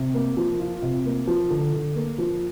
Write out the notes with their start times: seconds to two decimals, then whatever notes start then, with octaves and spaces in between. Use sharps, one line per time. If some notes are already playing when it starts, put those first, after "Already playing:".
Already playing: C3
0.14 A#3
0.37 F3
0.60 F4
0.82 C3
1.06 A#3
1.27 F3
1.50 D3
1.73 D3
1.96 A#3
2.18 F3